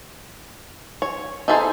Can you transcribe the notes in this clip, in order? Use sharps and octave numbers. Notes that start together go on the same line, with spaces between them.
C#5
D#4 E4 G#4 A4 C5